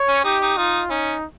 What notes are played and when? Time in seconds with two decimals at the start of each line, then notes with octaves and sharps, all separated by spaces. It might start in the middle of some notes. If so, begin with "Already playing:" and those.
Already playing: C#5
0.08 C#4
0.24 D#4 G4
0.41 D#4
0.57 D#4 F4
0.90 C#4 D#4